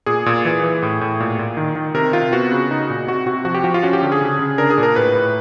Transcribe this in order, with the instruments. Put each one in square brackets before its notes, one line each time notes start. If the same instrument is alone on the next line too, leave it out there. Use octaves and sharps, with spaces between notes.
[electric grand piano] A#2 G#4
A#2
E3
E3
A2
A2
A#2
A#2
D#3
D#3
C3 A#4
C3 F4
B3 F#4
C#3
D#4
A#2
C3 F#4
C3 F#4
F3 F#4
G4
F3 F#4
F4
C#4 F#4
G4
D3
G#4
C#3
C#3
D4 A#4
G#4
A#2
A#4
A2 B4
A2